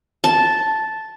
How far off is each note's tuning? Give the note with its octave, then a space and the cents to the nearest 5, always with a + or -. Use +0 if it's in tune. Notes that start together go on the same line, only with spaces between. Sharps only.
A5 -5